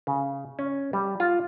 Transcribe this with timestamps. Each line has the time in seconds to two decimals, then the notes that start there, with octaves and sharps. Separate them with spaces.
0.07 C#3
0.59 C#4
0.93 G3
1.20 F4